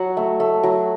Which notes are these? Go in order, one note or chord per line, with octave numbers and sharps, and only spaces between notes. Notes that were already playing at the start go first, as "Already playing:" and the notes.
Already playing: F#3 F#5
A3
A3
F#3